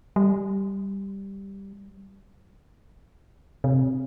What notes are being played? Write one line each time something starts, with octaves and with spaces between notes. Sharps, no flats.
G3
C3